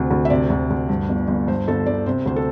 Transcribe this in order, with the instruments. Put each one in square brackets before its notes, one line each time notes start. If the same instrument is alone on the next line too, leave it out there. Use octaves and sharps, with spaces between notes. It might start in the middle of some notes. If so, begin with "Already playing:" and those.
Already playing: [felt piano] D2 C3
D2
E5
C3 D5
D2
D2
G2
G1
G1
G2 C5
G1 A4
G1 D5
C3 C5
D2 C5
A4